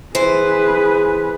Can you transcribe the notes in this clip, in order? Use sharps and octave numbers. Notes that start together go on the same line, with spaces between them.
E3 G#4 B4 C5